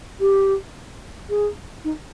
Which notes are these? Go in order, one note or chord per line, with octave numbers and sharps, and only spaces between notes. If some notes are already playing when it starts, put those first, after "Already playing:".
G4
G#4
D#4